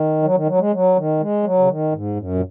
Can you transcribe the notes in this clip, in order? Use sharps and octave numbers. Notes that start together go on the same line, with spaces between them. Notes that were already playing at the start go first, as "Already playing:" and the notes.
Already playing: D#3
F#3
D#3
F#3
G#3
F#3
D#3
G#3
F#3
C#3
D#3
G#2
F#2
A#2